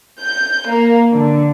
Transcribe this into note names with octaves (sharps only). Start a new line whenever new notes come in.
G6
A#3
D3